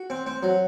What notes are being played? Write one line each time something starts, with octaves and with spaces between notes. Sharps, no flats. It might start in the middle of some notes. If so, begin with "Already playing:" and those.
Already playing: F#4
C4
C4
F#3